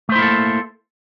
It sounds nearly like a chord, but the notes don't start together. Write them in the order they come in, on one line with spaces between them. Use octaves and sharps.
A3 C5 E4 A#3 A4